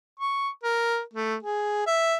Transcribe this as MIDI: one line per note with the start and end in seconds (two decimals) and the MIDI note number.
0.20 0.49 85
0.64 1.01 70
1.14 1.35 57
1.43 1.82 68
1.87 2.17 76